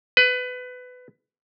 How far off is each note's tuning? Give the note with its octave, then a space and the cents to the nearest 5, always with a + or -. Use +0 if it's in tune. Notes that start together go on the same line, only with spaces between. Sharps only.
B4 +20